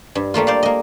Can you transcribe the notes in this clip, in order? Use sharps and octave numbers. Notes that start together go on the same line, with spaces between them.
G2
G3 A3 A#3 F4
C5 D5 F5
A#3 D#5